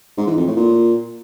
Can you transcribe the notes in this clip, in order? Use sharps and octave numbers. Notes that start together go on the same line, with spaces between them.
G#2
E3
F2
A2
A#2